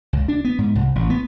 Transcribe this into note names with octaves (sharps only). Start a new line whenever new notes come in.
C#2
D4
B3
G#2
C2
A1
B3